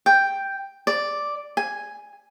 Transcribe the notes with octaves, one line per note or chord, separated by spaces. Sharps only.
G5
D5
G#5